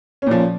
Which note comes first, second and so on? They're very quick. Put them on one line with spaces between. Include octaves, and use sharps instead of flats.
C#4 A#2 F3